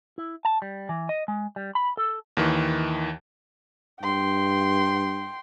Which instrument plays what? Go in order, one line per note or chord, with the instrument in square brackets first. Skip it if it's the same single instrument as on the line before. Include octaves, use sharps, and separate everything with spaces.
[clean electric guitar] E4
A5
G3
E3
D#5
G#3
G3
B5
A4
[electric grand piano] D#2 D#3 E3
[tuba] G2 [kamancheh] G5 C6